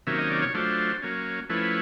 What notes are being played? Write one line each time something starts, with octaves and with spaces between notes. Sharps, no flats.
C3 D#3 F#3 A#3 C#4 E5
D#5
D5
C#5
F#3 A3 D4 F4 C5
F#3 A#3 C#4
F3 A3 C#4 E4 B4